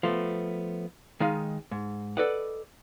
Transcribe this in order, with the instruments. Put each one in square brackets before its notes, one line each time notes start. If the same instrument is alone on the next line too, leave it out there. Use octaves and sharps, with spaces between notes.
[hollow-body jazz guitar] F3 A3 B3
D#3 G#3 D#4 F5
G#2
A4 B4 D5 D#5 F#5